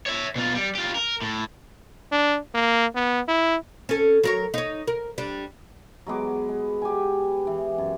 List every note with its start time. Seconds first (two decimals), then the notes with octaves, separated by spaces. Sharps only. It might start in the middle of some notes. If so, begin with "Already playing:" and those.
0.06 C#5 E5
0.36 B2 F4
0.55 G3
0.75 F4 G4
0.95 A#4
1.22 A2
2.12 D4
2.54 A#3
2.95 B3
3.29 E4
3.89 C#4 A4
4.24 F#3 A#4 C#5
4.54 D#4 C#5
4.88 A#4
5.18 G3 D4
6.07 F#3 G#3 B3 D6
6.49 G#3
6.82 G4 G#5
7.47 E3
7.78 F#2